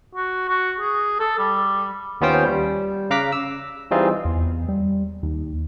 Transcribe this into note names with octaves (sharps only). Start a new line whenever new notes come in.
F#4
F#4
G#4
A4
G3
D#2 B3 C#4 F4 C5 G5
G3
C#3 F5 A#5 D6 F#6 B6
E6
E3 G3 C4 D#4 F4 G#4
E2
G3
D#2